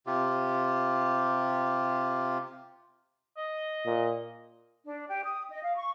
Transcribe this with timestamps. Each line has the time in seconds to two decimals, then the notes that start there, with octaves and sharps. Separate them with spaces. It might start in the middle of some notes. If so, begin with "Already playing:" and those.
0.06 C3 F4 G4
3.37 D#5
3.86 A#2
4.86 D4
5.08 G4
5.25 D#6
5.49 D#5
5.63 F5
5.76 C#6